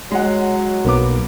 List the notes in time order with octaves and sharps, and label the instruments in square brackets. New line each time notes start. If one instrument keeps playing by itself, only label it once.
[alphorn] F#3 [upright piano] G#3 F#5
[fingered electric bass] B1 [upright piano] A#3 B3 D6